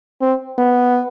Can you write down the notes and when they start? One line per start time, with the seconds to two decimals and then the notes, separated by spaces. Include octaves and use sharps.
0.22 C4
0.58 B3